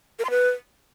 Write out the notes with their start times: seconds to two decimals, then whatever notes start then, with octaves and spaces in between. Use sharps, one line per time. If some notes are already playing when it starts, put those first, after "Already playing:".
0.19 A#4
0.25 C6
0.30 B4